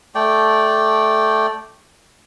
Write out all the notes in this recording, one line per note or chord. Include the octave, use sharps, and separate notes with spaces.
A3 D5 G5